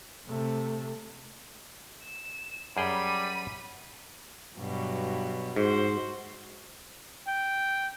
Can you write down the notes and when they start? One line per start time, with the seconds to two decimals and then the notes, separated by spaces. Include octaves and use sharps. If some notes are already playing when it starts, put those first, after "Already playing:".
0.27 C3 A3
2.04 E7
2.77 F#2 G3 G#4 G5 B5 D#7
4.58 G2 B2 F#3
5.56 G#2 F#4 C5
7.28 G5